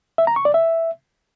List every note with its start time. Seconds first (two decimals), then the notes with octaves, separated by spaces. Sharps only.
0.18 E5
0.27 A#5
0.36 C#6
0.45 D5
0.54 E5